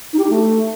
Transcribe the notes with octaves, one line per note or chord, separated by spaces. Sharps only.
D#4
G4
D#4
A3